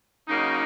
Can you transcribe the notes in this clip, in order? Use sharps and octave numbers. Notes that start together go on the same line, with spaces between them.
C#3 F#3 A#3 D#4